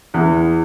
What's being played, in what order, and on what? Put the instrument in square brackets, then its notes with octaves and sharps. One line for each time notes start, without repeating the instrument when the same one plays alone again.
[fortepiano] E2